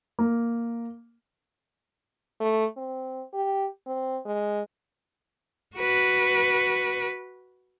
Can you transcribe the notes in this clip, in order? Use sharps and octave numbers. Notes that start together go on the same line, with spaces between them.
A#3
A3
C4
G4
C4
G#3
F#4 B4